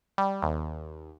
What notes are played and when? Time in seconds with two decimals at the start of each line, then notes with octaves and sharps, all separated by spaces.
0.18 G3
0.43 D#2